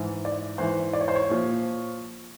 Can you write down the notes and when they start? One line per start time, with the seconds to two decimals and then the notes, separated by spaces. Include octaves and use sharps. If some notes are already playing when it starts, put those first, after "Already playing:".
Already playing: G#2 E3
0.25 D5
0.58 G#2 E3 C5
0.93 D5
1.01 C#5
1.08 C5
1.15 C#5
1.29 A#2 F3